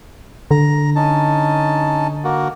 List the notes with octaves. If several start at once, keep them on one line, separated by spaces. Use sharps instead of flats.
D3 A#5
C#4 D#4 A5
A#3 F#4